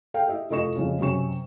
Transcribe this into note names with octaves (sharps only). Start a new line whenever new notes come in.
A4 F5 G5
G4 D#5 E5
F1 F4 A4 D#5 C#6 E7
F2 C#3
F#2 C3 C#4 C#6 E7